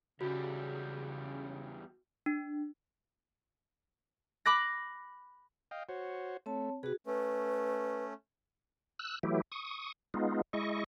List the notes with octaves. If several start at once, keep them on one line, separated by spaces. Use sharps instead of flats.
E2 C#3 G3 F#4
D4
B5 D6 F#6 A#6
D#5 F5 G5
F#4 C5 C#5
A3 C4 C#5 A5
C3 F#4 G#4 B4
A3 C#4 B4
E6 F#6
E3 F#3 A3 E4 G4
C#6 D#6
G#3 B3 D#4 F4
G#3 E4 D#5 C#6